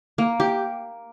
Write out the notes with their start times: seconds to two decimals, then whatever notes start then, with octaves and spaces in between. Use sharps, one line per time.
0.18 A#3
0.40 G4